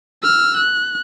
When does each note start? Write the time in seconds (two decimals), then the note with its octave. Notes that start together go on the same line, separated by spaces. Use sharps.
0.23 E6 F6
0.57 F#6